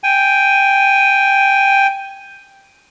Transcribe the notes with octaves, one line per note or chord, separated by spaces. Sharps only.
G5 G#5